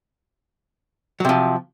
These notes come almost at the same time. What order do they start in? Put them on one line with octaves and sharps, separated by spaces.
F#3 C3 F3